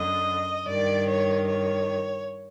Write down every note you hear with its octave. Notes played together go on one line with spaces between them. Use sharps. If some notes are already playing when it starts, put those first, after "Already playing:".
Already playing: F#2 D3 D#5
G2 D#3 D5
C#5
C#5